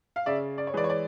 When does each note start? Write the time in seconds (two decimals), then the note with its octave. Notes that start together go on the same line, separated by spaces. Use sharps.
0.16 F5
0.26 C#3 D5 E5
0.58 D5
0.67 C#5
0.73 E3 G#3 D5
0.84 C#5
0.89 D5